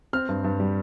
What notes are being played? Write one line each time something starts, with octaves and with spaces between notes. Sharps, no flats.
C4 F6
G2
G2
G3